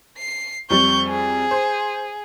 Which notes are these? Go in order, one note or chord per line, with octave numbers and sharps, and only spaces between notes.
C7
F2 G3 C#6 G6
G#4
C5